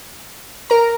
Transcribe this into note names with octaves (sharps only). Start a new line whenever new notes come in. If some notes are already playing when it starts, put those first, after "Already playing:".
A#4 A#5